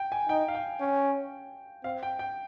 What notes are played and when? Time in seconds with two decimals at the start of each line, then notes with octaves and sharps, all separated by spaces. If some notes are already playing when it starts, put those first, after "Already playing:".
Already playing: G5
0.12 G#5
0.29 D#4 G5
0.48 F5
0.55 G5
0.81 C#4
1.84 C4 F5
2.03 G5
2.19 G5